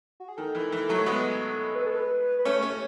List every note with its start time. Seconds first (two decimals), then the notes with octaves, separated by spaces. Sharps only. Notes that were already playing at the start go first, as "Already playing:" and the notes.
0.20 F#4
0.28 G#4
0.37 D#3 A4
0.55 E3
0.72 E3
0.89 F#3 A3
1.06 G#3 B3
1.75 B4
1.86 A4
1.96 B4
2.39 B4
2.45 A3 C#4 C#5
2.62 A3 C#4